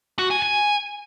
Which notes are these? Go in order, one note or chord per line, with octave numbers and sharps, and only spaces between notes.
F#4
G#5
G#5